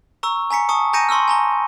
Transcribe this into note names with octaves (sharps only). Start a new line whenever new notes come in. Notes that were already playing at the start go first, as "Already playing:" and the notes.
A#5 C#6 E6
G#5 A#5 B6 C#7
A5 C#6 D#6 C#7
G#5 A#5 G6 A#6 C#7 D#7
A5 C6 C#6 E6 F6
G#5 A#5 G7